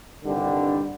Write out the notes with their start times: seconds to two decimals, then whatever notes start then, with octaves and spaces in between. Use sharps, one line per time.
0.24 C2 G2 D3 D#3 G3